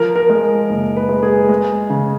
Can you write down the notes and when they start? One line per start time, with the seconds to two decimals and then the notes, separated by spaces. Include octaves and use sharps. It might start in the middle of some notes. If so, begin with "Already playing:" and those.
Already playing: F3 A#4
0.16 A#4
0.30 G#3
0.70 F#1
0.97 B4
1.09 G#3
1.23 G#4
1.49 G#3
1.90 C#3